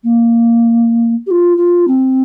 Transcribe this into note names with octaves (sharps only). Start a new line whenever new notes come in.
A#3
G4
F4
F4
C4